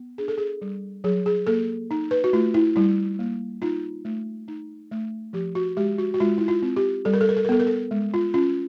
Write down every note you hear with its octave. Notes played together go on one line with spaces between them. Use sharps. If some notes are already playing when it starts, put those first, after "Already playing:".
Already playing: B3
D4 G#4
A4
G#4
G3
F#3 G#4
G#4
A#3 A4
D#4
B4
F#4
A3 F4
E4
G3 E4
A#3
D#4 F4
A3
D#4
A3
F3 G4
F#4
G#3 G4
F#4
F#4
G#3 F4
E4
F4
C4
G4
G3 A4
A#4
A4
A#4
A4
A#4
B3 A4
A#4
A4
G#3
F4
C#4 F4